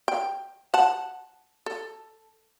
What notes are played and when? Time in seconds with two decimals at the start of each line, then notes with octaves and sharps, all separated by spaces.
0.08 G5
0.74 F#5 A5
1.66 A4